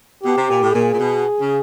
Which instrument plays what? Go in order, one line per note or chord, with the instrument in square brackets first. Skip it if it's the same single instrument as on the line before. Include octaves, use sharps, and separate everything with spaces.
[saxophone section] B2 [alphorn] G4
[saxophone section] C3
A#2
A2
[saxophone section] A#2 [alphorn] G#4
[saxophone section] A#2
B2
C#3